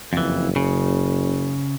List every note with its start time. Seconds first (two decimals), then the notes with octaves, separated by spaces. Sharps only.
0.13 F#1 F2 E3
0.56 C#3